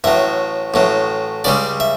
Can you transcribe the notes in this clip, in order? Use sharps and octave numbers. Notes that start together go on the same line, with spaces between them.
A1 A2 F#3 E5
A1 A2 F#3
C#2 C#3 G3 D5
E5